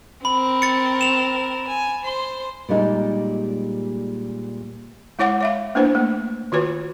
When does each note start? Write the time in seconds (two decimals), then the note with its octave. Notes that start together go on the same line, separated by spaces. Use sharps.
0.25 C4 A#4 B5
0.62 A6 C#7
1.01 E7 F7
1.68 G#5
2.03 C5 C6
2.69 A#2 G3 G#3 D#4
5.19 G#3 E4 C#5 F#5 D6
5.41 C#5 E5 F5
5.75 A#3 B3 D4 E4 B4 C5
5.95 A3 A#3
6.52 D#3 F4 F#4 B4 C#5